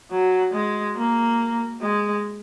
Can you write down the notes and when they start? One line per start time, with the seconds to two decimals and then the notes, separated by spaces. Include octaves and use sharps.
0.12 F#3
0.54 G#3
0.96 A#3
1.82 G#3